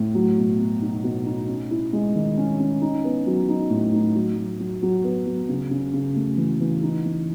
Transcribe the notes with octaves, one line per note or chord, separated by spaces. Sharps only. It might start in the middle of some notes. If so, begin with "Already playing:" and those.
Already playing: A2
F#3
B2
B2
D#4
B2
D#4
C#4
E4
G#3
D#3
C#4
C#4
D#4
B3
F#3
D#4
A2
D#4
F#3
F#3
F#3
F#3
B3
F#3
C#3
C#3
C#3
A3
E3
E3
D#4
E3